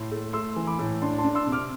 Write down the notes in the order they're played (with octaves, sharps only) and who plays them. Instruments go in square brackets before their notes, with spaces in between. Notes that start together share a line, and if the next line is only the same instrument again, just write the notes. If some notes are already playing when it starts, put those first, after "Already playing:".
Already playing: [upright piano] A2 C6
A3
A3 C6 E6
E3
B5 D6
A2
D4 A5 C6
A5 C6
D4
C6 E6
C3
D6 F6